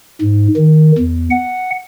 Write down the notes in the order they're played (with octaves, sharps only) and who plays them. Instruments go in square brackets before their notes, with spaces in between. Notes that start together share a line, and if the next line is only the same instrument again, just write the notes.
[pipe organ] G#2
D#3
E2
F#5